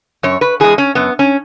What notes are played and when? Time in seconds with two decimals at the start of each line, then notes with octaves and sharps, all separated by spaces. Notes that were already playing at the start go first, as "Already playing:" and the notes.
0.23 F#2 C#5
0.41 B4
0.60 E3 G#3 G#4
0.78 C#4
0.95 F#2 B3
1.19 C#4